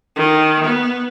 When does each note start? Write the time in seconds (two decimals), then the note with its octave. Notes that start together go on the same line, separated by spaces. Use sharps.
0.16 D#3
0.64 B3